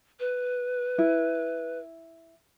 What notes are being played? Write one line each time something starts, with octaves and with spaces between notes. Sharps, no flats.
B4
E4